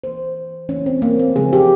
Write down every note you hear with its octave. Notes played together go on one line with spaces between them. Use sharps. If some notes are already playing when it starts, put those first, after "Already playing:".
E3 A#3 C5
E3 A#3 C#4
C4
A#3
C4
C#3 F3 G#3 G#4
G4